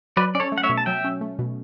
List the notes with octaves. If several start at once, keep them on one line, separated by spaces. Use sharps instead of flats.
F#3 B4 D5
C#4 D5
A4 C#5
A3
F#5
C#5 E5
B2
A5
F#3 E5 G5
C#4
A3
B2